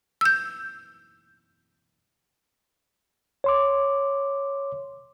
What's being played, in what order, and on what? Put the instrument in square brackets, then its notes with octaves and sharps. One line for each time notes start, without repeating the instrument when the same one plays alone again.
[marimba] E6 G6
[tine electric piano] C#5 C6 D6